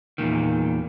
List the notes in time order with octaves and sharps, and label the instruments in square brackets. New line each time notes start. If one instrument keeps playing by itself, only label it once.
[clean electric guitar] E2 G2 A#2 D#3